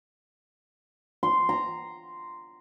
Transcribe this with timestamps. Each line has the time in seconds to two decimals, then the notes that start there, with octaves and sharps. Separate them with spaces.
1.23 C6
1.49 A#5